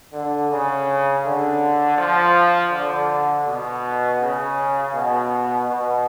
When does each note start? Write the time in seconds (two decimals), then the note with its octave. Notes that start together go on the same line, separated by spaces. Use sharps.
0.13 D3
0.50 C#3
1.24 D3
1.98 F3
2.73 D3
3.47 B2
4.21 C#3
4.94 B2
5.69 B2